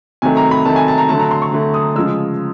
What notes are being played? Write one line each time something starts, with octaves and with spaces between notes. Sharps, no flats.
C3 D#3 F#3 A3 G#5
A#5
B5
C3 D#3 F#3 A3 A5
G#5
A5
A#5
D3 F#3 A3 A5
A#5
C6
C#6
D3 F#3 A3
D#6
C#3 F3 G#3 E6